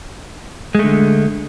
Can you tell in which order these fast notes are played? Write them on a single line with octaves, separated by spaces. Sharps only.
G#3 A3 D3